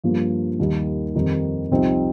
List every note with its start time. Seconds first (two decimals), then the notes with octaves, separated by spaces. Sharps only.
0.04 G2 F3 A#3
0.59 D#2 D#3 G3 D#4
1.15 F2 D#3 G3 D#4
1.71 C2 C3 F3 C4 D#4